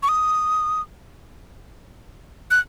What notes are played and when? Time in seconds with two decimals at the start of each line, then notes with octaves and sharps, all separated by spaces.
0.03 C#6
0.09 D#6
2.51 F#6